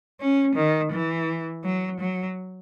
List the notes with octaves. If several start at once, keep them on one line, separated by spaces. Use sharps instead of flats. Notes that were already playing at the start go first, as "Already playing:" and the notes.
C#4
D#3
E3
F#3
F#3